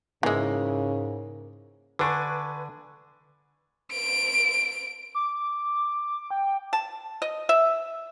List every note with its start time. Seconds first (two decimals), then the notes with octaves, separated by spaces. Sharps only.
0.23 G#2 C#3 E3 G#3 A#3 E4
1.99 D3 D4 B4 G#5 C#6
3.92 D7
5.15 D6
6.31 G5
6.73 A5
7.22 D#5
7.49 E5